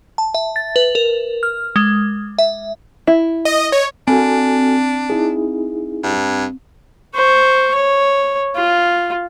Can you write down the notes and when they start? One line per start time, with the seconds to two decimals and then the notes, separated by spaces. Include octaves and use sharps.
0.18 A5
0.34 E5
0.56 A6
0.76 B4
0.95 A#4
1.43 F6
1.76 G#3
2.39 E5
3.07 E4
3.45 D#5
3.72 C#5
4.08 C4 D4 F#4 A4 G#5
5.10 D#4 E4 G#4
6.03 G2
7.15 C5 C#6
7.75 C#5
8.56 F4